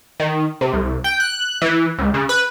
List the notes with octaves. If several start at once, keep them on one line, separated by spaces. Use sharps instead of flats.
D#3
C3
C2
G5
F#6
E3
C#2
C#3
B4